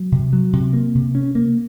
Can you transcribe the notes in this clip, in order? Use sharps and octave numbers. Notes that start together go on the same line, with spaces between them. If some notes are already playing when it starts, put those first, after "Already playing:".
Already playing: F#3
C3
F#3
C3
A#3
C3
C#4
A#3